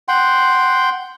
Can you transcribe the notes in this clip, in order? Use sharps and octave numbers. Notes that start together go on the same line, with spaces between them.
F#5 G5 C6